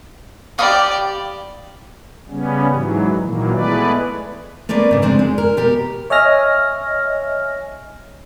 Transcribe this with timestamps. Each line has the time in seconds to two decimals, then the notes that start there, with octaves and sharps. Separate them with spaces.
0.59 G4 D5 F5 B5 D#6
2.29 C#3 G3 B3 C#4
2.70 G#2 E3 F#3
3.23 A#2 D#3 E3 F#3 A#3
3.53 E3 G#3 A3 B3 B4 D5
4.69 A3 A#3 C4 B4 D5
4.91 G#2 C#3
5.02 G#3 C4 D4
5.19 G#3
5.38 A#4
5.57 B2 G4 A#4
6.10 C#5 D#5 E5 G#5 F6 A#6